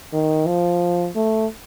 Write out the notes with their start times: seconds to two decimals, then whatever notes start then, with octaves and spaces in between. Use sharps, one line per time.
0.13 D#3
0.47 F3
1.16 A3